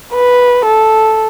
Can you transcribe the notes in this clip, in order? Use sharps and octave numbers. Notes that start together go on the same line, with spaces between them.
B4
A4